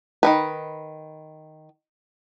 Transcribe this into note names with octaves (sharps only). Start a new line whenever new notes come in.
D#3 G#3 B4